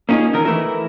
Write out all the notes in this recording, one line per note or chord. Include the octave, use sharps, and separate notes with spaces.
A#3 C#4 D#4 F4 G#4
E2 D#3 A#4
E3 A3 E4 A#4